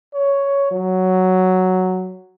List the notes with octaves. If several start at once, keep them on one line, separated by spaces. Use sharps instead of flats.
C#5
F#3